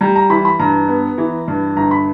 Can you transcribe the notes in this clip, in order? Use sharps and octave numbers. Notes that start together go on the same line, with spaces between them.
G3 A#5
A#5
E3 B5
B5
G2 A#5
B3
E3
G2
G1 A#5
B5